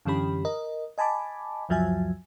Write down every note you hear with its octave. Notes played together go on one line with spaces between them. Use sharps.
F#2 D3 E3 C#4 G4 B5
A#4 D#5
D#5 G#5 A5 B5 D6
C#2 F#2 F3 F#3 E5 G#5